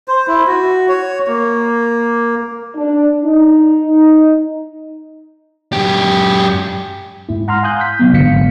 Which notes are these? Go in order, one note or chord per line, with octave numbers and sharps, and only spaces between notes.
C5
E4
F#4
C#5
A#3
D4
D#4
F#2 G4
G#2 E4
F#5 A#5 C6 F6
F5 G#5 A#5 D#6 F#6 G6
G6 B6
C3 F#3 B3
G1 G#2 D3 F5 B6 C#7